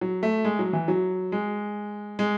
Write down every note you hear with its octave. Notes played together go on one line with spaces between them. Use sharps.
F#3
A3
G#3
F#3
E3
F#3
G#3
G#3